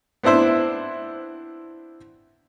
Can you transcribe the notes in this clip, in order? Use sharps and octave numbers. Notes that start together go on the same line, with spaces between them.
B3 C4 D4 E4 C5